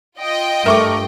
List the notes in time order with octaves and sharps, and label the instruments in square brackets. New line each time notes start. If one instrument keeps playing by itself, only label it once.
[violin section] F4 D#5 G5
[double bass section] G2 A3 [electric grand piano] A#4 C#6 D6 [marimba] E5